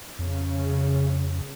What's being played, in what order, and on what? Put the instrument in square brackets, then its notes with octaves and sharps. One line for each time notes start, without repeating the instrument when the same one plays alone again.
[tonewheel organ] F2 [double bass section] C#3